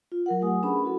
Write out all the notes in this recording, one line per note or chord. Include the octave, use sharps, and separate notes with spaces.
F4
F#3 A#4 F#5
A3 G4 G#5 D#6
C#4 D4 G#4 B4 F#5 B5
E4 F#4 A4